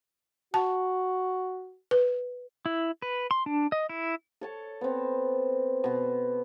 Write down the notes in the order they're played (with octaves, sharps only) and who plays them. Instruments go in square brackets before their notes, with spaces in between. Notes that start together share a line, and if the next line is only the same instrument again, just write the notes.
[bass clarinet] F#4 [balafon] A5
[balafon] B4
[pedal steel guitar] E4
B4
C6
D4
D#5
E4
[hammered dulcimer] A4 C#5 A5
B3 C4
B2 B3